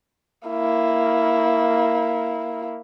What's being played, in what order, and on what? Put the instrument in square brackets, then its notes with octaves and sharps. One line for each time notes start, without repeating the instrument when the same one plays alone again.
[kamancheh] A#3 E4